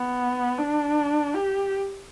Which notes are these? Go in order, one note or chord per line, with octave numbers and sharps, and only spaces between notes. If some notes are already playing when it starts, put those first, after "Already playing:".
Already playing: B3
D4
G4